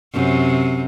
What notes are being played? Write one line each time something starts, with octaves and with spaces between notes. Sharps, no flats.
F#2 C3